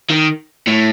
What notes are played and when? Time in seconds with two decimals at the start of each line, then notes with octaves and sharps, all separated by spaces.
0.10 D#3
0.67 A2